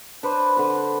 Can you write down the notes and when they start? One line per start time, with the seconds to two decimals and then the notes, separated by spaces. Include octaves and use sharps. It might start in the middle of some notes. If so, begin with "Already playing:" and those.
0.23 D4 B4 C5
0.57 D3 B4